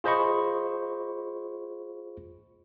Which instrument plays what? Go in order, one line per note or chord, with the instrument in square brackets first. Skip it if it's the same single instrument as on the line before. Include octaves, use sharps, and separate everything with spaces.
[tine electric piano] F4 G#4 C5 D#5 B5 C#6